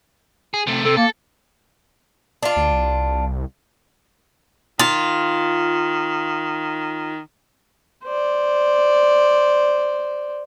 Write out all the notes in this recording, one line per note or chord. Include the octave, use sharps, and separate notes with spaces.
G#4
C3 A3
C3 A4
A#3 A4
D4 F4
D2
C2
D#3 F4
C5 D5